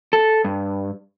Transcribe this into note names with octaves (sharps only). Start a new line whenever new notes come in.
A4
G2